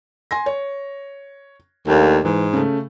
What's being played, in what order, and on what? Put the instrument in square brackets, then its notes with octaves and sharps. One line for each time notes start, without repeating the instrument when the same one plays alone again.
[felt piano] G#5 C6 A#6
C#5
[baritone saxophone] D#2 [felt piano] A3 A#3 D4
[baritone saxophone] G#2 [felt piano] E3
[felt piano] C#3 A3